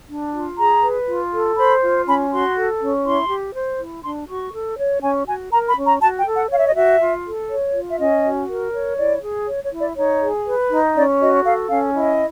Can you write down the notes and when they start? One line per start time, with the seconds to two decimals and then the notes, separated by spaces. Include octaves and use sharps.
0.08 D4
0.32 F4
0.57 G#4 A#5
0.82 B4
1.07 F4
1.32 A4
1.57 C5 B5
1.81 F4
2.06 C#4 B5
2.30 F#4 C6
2.55 A4
2.80 C#4
3.04 E4 C6
3.29 G4
3.54 C5
3.79 E4
4.03 D4 C6
4.28 F#4 C#6
4.53 A4
4.77 C#5
5.02 C#4 G#5
5.27 F#4 G#5
5.52 A#4 A#5
5.68 B5
5.76 C#4
5.85 A#5
6.01 F#4 A5
6.17 G5
6.26 A4
6.34 F#5
6.50 C#5 F5
6.58 E5
6.66 D#5
6.74 F#4 E5
7.00 F4
7.25 A4
7.49 C#5
7.74 F4
7.88 E5
7.98 C#4 D#5
8.23 F#4
8.48 A#4
8.73 C#5
8.98 E4 D5
9.22 G#4
9.47 C#5
9.63 C#5
9.71 E4
9.80 D5
9.96 D#4 C#5
10.21 G#4
10.46 B4
10.70 D#4
10.95 C#4 D5
11.20 F#4 D#5
11.44 A4 F5
11.69 C#4 F5
11.94 E4 D#5